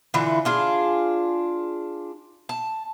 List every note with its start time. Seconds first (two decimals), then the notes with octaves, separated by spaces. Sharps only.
0.14 D3 E3 E4 F4
0.45 D4 F4 G#4
2.49 A5